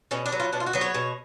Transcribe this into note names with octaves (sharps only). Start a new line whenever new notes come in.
B2 C#4
D4
F#3 B3
F4
B2 D4
F4
F#4
F#3 B3
C#5
B2